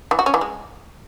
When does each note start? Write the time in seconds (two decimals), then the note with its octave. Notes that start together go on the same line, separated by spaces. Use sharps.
0.11 E3
0.19 F#4
0.26 C#4
0.34 E3
0.41 G#3